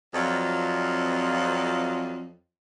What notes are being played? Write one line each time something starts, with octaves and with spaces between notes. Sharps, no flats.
F2 F#3 C4 F4 D5 D#5